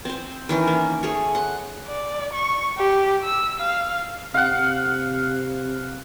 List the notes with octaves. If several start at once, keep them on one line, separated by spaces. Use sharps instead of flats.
C4 C5
D#3 E3 C#4
A#3
A3 G#4 C#5 C#6
F#5 C6
D5
C#6
G4
E6
F5
C3 F5 F#5